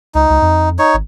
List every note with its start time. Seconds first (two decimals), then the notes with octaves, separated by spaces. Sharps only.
0.15 C#2 D#4
0.30 C#2
0.42 F2
0.79 D#4 C#5
0.94 G#1